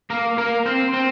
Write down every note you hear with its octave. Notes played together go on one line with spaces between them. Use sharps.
A#3 A#4
A#3 A#4
C4 C5
C4 C5